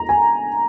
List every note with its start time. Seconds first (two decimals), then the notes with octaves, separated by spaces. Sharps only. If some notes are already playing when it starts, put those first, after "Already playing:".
Already playing: A#5
0.09 G#5